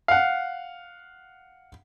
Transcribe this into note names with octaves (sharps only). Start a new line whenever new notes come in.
F5 F#5